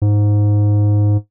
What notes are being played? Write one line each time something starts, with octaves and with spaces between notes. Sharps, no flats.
G#2